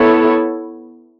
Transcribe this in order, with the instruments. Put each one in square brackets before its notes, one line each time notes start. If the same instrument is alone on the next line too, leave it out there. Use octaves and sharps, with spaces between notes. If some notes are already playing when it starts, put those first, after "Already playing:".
Already playing: [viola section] B3 E4 A4 C#5